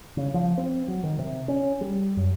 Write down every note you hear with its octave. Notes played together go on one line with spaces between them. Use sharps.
C#3
F3
C4
F#3
D#3
C3
C#4
G3
F#2